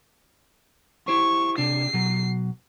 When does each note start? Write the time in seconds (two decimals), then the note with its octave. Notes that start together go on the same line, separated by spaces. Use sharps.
1.08 E4 G4 C5 C#6
1.58 C3 D4 C7
1.94 B2 F#3